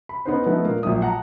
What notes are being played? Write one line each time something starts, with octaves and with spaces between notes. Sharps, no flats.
B5
B3 C#4 D#4 B4 C5
F3 A3 B3 D#4
A#2 A#3
A#1 F3 F#3 E5 D#6
F#5 A5 A#5